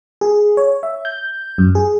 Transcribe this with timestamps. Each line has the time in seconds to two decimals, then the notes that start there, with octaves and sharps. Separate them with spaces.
0.21 G#4
0.57 C#5
0.83 E5
1.05 G6
1.58 F#2
1.75 G#4